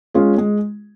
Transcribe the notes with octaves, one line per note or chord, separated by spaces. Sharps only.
G#3 C#4 F4 G#4
G#3